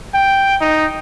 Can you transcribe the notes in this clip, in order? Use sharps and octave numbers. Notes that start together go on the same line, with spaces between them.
G5
D#4